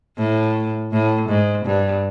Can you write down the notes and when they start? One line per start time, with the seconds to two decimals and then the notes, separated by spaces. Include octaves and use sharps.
0.18 A2
0.93 A2
1.29 G#2
1.66 G2